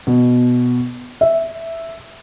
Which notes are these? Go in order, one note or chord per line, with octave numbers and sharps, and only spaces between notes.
B2
E5